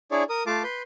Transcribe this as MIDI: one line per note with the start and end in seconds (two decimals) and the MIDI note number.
0.11 0.23 62
0.11 0.23 64
0.11 0.23 68
0.11 0.23 73
0.11 0.23 74
0.29 0.43 70
0.29 0.43 87
0.47 0.63 57
0.47 0.63 65
0.47 0.63 77
0.47 0.63 81
0.47 0.63 86
0.63 0.82 71
0.63 0.82 84
0.63 0.82 91